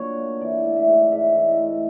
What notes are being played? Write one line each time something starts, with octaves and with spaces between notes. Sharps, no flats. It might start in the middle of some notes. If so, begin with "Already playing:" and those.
Already playing: A#2 F#3 D4 C#5
A#3
E3 D5
A3
E5
G#2
G#2 E5
E3
D#5
A3